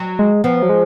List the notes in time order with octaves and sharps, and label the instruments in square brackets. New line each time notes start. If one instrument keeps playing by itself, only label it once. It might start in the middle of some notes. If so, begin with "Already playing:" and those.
Already playing: [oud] F#3
[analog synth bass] G#3
[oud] F3 [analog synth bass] B3
[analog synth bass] F#3
G#3